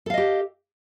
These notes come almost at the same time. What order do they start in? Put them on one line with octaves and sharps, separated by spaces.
A4 F5 D#5 G4